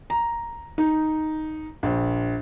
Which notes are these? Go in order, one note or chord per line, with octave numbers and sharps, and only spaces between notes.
A#5
D#4
A#1